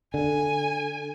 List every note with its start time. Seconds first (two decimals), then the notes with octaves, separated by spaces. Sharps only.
0.14 D3 G#5